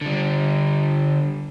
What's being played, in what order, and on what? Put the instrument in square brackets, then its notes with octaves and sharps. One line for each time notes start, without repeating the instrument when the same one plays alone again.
[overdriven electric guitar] D3 G3